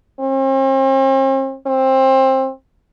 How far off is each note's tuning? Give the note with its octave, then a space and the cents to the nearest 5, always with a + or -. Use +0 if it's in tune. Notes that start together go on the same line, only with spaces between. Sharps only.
C4 +45
C4 +20